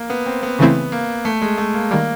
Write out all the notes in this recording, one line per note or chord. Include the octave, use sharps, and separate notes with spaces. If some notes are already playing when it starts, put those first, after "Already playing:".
Already playing: A#3
B3
C4
B3
C#3 E3 A3 C4 E4
A#3
A3
G#3
A3
A#3
D#3 G3 A#3